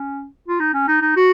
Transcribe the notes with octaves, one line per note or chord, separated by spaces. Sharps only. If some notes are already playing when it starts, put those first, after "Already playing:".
Already playing: C#4
F4
D#4
C#4
D#4
D#4
F#4